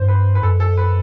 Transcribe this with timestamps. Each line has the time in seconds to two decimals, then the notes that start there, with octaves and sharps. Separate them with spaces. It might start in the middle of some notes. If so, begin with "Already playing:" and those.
Already playing: G2 C5
0.08 B4
0.35 B4
0.42 F#2 A4
0.60 A4
0.77 B4